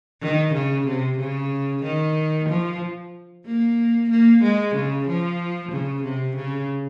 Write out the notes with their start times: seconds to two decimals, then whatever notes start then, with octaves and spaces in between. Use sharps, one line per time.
0.22 D#3
0.54 C#3
0.87 C3
1.19 C#3
1.83 D#3
2.49 F3
3.46 A#3
4.11 A#3
4.43 G#3
4.75 C#3
5.08 F3
5.72 C#3
6.04 C3
6.36 C#3